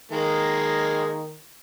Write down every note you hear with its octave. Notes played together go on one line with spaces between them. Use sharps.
D#3 G#3 A#3